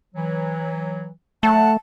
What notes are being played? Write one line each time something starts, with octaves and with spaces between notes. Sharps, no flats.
E3 F#3
F#3 A3 F#5 A5